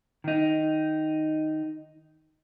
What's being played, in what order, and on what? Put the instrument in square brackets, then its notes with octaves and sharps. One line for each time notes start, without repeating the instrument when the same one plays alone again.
[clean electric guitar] D#3 D#4